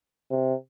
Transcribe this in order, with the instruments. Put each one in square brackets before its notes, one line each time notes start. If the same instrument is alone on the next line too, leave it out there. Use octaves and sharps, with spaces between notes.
[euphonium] C3